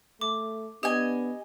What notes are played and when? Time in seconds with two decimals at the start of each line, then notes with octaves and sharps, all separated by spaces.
0.21 A3 D6
0.83 B3 D4 G4 D#5 G#5